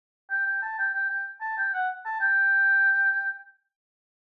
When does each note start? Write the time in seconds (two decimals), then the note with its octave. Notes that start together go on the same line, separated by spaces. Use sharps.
0.30 G5
0.46 G5
0.62 A5
0.79 G5
0.94 G5
1.09 G5
1.41 A5
1.57 G5
1.73 F#5
2.05 A5
2.21 G5